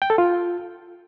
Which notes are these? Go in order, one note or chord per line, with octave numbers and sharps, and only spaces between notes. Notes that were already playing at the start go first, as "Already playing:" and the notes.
G5
A4
F4